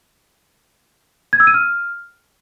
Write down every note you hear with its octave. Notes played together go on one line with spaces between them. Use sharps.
G#6
E6
D#7
F6